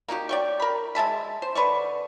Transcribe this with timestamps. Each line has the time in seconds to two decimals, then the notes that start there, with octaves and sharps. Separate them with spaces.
0.08 A#3 D#4 F#4 G4
0.29 D5 G5 C#6
0.60 A#4 B5
0.95 G#3 E5 A5 B5
1.42 C5
1.55 D3 B4 D5 C#6